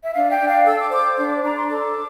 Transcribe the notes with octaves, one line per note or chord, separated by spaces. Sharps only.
E5
D4 F5
G5
D4
F5
A4 E6
D6
C5 D6
D4 D6
D6
D4 A#5
C6
A4 D6